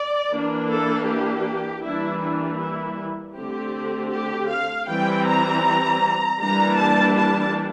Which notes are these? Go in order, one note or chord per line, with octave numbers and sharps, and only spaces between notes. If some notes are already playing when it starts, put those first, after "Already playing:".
Already playing: D5
E3 A#3 D4
A4
G4
E3 G3 A#3 D4 E4
D4
E4
D3 A3 C4 G4
G4
F5
E3 G3 C4 G5
A#5
E3 G3 A#3 D4 A#5
A5
A5